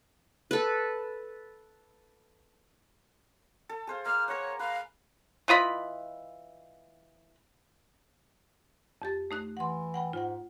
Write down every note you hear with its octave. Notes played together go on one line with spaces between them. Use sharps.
A4 B4
A4
G#4 C5 F5
A#3 F6
A#4 C#5 F#5
B4 F5
E3 F4 D#5 B5
F2 G4 A6
A3 D#4 F#6
E3 F#5 C6
F#5 G5 B5
G#2 F4 F#5